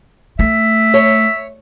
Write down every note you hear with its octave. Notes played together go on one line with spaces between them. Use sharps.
A3 E5
C#5